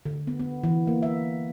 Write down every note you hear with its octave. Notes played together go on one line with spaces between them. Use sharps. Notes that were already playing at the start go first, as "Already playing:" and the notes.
D3
B3
B3
E3
A#3
E5